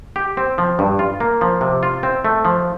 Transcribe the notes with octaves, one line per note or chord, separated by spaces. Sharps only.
G4
C4
F3
G2
F4
A#3
F3
C3
F4
C4
A3
F3